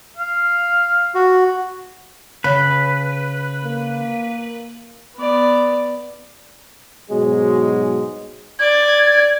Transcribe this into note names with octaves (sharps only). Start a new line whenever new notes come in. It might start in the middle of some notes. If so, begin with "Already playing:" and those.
F5
F#4
C#3 B4
A#3
B3 D5
G#2 B2 F#3 G#3 G#4
D5 G#6